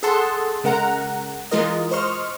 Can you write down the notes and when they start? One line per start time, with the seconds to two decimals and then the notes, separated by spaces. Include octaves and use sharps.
0.03 G#4 A4 F#5 A5 C6
0.64 C#3 G#3 A#4 F#5 A#5
1.51 E3 G#3 F4 A#4 D#5
1.91 C5 D#5 C6 C#6 F6